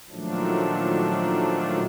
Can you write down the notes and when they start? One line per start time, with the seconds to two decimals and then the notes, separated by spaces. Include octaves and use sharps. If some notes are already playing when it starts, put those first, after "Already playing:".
0.10 A#2 D#3 F3 F#3 A3 D4